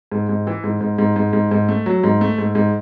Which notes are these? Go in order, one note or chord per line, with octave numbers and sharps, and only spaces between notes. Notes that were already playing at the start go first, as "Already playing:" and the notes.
G#2
G#2
E3
G#2
G#2
G#2
G#2
G#2
G#2
A3
F#3
G#2
A3
G#2
G#2